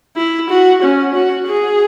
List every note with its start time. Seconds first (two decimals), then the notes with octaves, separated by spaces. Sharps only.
0.17 E4
0.50 F#4
0.82 C#4
1.15 F#4
1.47 G#4